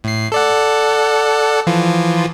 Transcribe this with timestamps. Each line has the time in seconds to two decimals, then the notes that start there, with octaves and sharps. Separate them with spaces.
0.04 A2 C7
0.32 A4 D5 F#5
1.67 E3 F3 F4